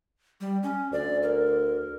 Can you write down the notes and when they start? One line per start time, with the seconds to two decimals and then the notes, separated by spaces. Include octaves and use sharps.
0.41 G3
0.63 C#4
0.92 D2 D5
1.23 A#4